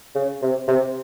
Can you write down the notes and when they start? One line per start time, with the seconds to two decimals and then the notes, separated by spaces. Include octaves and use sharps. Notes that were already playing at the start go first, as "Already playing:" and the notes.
0.15 C#3
0.42 C3
0.68 C3